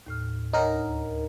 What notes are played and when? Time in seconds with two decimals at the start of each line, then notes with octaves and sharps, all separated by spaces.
0.06 D#2 A2 F6
0.53 D#4 A#4 C#5 F#5 G#5
0.73 D2